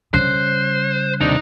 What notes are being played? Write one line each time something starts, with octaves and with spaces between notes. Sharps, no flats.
C#3 G3 C5 F#6
D#2 C3 D4 D#4